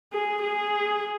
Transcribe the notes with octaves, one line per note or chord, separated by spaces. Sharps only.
G#4
G#4